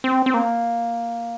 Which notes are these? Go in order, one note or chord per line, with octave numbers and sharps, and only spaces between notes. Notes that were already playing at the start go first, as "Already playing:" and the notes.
C4
C4
A#3